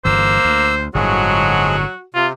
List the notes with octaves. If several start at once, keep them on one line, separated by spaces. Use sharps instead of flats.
G1 G2 E3 A#3 C5 E6
D2
G1 A2 D3 F3 F#3 G#3 F#4 G#4
C3 F4